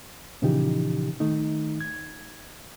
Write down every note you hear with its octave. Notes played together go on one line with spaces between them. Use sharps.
A#2 C#3 E3 F3 D#4 G4
D#3 A3 D#4
G#6